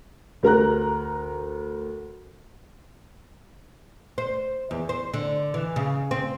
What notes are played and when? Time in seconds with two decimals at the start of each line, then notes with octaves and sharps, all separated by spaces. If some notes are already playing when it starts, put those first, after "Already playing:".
0.43 D2 A#4 A#5 F#6
4.18 C5
4.71 E2
4.89 C5
5.14 D3
5.54 E3
5.76 C#3
6.11 C4